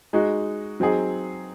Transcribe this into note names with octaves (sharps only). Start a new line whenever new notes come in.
G#3 D#4 F#4
F#3 C4 D#4 G#4